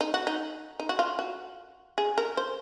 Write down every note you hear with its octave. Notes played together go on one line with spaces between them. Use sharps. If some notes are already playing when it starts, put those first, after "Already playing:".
D#4
F#4
D#4
D#4
F#4
F4
F#4
G#4
A#4
C5